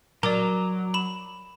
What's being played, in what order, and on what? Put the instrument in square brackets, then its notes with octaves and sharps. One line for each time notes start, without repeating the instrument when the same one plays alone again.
[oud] F#3 [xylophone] A#4 D5 [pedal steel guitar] A#5 D6
[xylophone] B5 E7